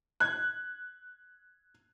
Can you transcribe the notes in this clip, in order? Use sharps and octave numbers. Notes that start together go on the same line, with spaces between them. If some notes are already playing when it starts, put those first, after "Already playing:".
F#6 G#6